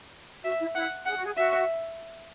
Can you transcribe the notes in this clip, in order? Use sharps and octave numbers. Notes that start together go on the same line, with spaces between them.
F#4 E5
E4
E4 F#5
G#4 F#5
F#4
G#4
F#4 E5